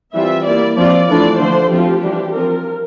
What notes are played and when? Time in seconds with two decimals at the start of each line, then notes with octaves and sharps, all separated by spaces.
0.13 E3 G3 C4 F4 E5
0.46 G3 A#3 E4 D5
0.77 F3 C4 F4 D5
1.09 E3 A3 D4 F4 D5
1.39 D3 F3 A3 D4 C5
1.71 F3 C4 F4 G4
2.03 E3 G3 D4
2.34 F3 C4 F4 A#4